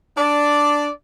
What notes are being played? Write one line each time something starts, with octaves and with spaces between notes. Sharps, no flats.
D4 D5